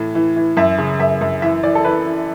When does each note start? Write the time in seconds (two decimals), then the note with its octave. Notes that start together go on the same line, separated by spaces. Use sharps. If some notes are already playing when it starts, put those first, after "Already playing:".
Already playing: A2 E3
0.15 E3
0.36 E3
0.57 F#2 E5
0.78 C#3
1.00 F#2 E5
1.21 F#2
1.42 E3 E5
1.63 E3 D5
1.75 A4
1.84 E3 B4
2.06 E3